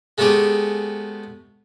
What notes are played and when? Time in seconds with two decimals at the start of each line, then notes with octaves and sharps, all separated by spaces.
0.18 G#3 A3 B3 C#4 G4 G#4